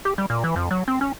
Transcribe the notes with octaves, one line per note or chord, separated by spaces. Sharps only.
G4
G3
A#2
E3
F2
F#3
C4
C#4